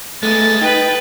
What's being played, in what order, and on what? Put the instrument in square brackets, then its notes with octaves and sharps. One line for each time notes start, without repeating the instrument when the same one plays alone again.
[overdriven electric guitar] G#3 B3 [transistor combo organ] A3 [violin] A6
[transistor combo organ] D#4 [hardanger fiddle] B4 B5 [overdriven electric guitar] G5